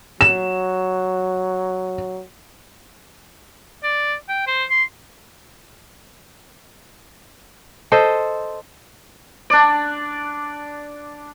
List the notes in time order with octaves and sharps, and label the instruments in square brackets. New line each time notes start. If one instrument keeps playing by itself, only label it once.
[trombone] F#3 [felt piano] E7
[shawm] D5
G5
C5
C6
[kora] A4 C5 D#5
[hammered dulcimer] D4 D5